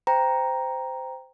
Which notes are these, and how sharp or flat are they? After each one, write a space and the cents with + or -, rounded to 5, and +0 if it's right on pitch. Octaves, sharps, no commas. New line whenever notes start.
C5 -15 G5 +5 A#5 +5